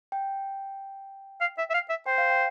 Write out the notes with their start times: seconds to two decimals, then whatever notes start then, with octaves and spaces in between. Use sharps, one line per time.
0.12 G5
1.41 F5
1.58 E5
1.70 E5
1.74 F5
1.90 E5
2.06 C5 G5
2.18 F5
2.30 G5